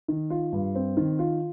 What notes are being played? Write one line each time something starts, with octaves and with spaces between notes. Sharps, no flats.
D#3
F4
G2
C4
D#3
F4